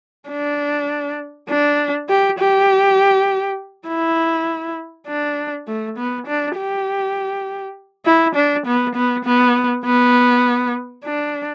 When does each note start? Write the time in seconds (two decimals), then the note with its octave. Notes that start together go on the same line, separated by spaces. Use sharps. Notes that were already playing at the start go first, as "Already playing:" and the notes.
0.29 D4
1.49 D4
2.09 G4
2.39 G4
3.88 E4
5.08 D4
5.68 A3
5.97 B3
6.27 D4
6.57 G4
8.06 E4
8.35 D4
8.66 B3
8.96 B3
9.25 B3
9.85 B3
11.05 D4